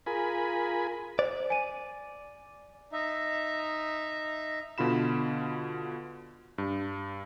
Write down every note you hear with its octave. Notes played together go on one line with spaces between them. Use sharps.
F4 G#4 A#4 G#5 B5
C5 D5
G#5 D#7
D#4 E5
B2 D3 F4 B5 E7
G2